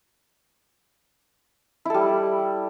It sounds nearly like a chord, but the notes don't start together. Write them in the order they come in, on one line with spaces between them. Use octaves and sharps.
E4 A4 G3